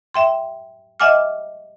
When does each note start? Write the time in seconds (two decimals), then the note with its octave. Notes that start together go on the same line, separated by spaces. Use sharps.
0.14 E5 G5 C6
1.00 D#5 E5 F#5 G#5 D6 F6